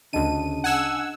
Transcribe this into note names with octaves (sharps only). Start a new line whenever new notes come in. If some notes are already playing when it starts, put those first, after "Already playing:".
D2 C#3 D4 D#5 A5 D#7
F#5 G#5 E6